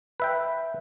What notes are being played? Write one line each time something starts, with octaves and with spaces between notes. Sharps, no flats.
B4 E5 G5